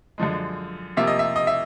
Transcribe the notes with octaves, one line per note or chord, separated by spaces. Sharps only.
F#2 D3 F3 G#3
C3 F3 A#3 E5
D#5
E5
D#5
E5